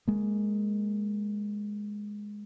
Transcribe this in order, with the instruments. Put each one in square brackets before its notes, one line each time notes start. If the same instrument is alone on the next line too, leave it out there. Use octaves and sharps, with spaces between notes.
[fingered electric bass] G#3 A#3